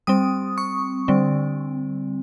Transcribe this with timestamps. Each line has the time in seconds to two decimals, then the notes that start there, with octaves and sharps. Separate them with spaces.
0.07 G3 C4 D#6
0.58 C#6
1.08 D3 G3 C4